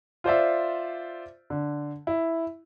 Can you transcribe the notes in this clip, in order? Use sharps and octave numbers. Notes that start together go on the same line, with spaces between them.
F4 C5 D5 E5
D3
E4